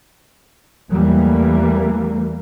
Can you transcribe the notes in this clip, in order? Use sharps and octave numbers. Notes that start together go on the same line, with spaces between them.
E2 E3 G3 A3 A#3